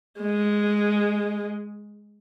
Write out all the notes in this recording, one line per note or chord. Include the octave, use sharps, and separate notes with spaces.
G#3